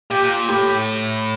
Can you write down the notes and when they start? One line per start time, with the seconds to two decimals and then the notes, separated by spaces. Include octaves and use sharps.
0.11 A#2 G4
0.48 A2 G4